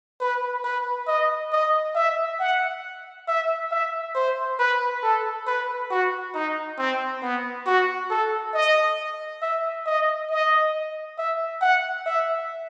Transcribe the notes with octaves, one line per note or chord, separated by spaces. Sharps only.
B4
B4
D#5
D#5
E5
F#5
E5
E5
C5
B4
A4
B4
F#4
D#4
C4
B3
F#4
A4
D#5
E5
D#5
D#5
E5
F#5
E5